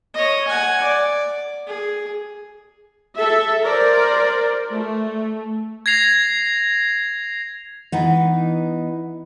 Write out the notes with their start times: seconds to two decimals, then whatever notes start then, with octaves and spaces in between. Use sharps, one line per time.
0.15 C#5 D#5
0.48 F#5 G#5
0.83 D5
1.67 G#4
3.16 A4 E5
3.64 A#4 C5 D5
4.72 A3
5.86 G#6 A#6 C7 F7
7.92 E3 B3 D#4